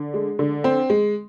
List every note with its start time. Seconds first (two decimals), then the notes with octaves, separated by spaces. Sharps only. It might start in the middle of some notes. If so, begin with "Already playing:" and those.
Already playing: D3
0.14 G#3
0.39 D3
0.64 C4
0.90 G#3